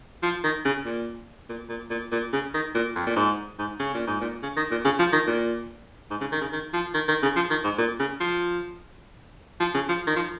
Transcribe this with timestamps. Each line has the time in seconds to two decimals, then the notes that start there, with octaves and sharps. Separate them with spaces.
0.23 F3
0.44 D#3
0.65 C#3
0.85 A#2
1.49 A#2
1.69 A#2
1.90 A#2
2.12 A#2
2.33 C#3
2.54 D#3
2.75 A#2
2.96 F2
3.07 A#2
3.16 G#2
3.59 G#2
3.80 C#3
3.94 A#2
4.07 G#2
4.21 A#2
4.43 C#3
4.57 D#3
4.71 A#2
4.85 C#3
4.99 F3
5.12 D#3
5.27 A#2
6.11 G#2
6.21 C#3
6.32 D#3
6.41 C#3
6.52 D#3
6.74 F3
6.94 D#3
7.08 D#3
7.23 C#3
7.36 F3
7.50 D#3
7.64 G#2
7.78 A#2
8.00 C#3
8.20 F3
9.60 F3
9.75 C#3
9.89 F3
10.07 D#3
10.16 F3